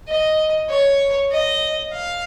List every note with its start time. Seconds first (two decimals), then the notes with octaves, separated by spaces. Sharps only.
0.08 D#5
0.69 C#5
1.31 D#5
1.92 F5